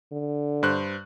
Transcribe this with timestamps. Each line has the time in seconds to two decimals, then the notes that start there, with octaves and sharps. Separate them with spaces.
0.12 D3
0.63 G2 C5 F#6